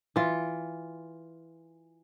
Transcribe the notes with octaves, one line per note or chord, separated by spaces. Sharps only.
E3 F4